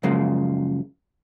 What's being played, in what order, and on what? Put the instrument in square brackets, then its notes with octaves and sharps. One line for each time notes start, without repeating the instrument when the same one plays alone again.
[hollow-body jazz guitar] F#2 C#3 F3 G#3 A#3